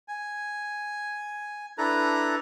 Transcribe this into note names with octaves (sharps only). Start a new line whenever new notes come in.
G#5
D4 E4 A4 B4 A#5